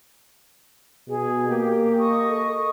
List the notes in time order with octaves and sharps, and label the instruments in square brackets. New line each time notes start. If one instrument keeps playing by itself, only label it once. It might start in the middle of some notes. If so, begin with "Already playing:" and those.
[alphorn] B2 [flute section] G#4
[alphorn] A#3 [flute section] G4
[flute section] D#5 C#6 D#6
[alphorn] A4